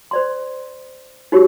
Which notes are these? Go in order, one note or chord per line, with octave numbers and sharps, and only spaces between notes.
C5 D5 C6
D#4 F#4 G4 C#5